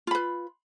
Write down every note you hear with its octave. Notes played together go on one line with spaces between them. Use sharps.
F4 B4 B5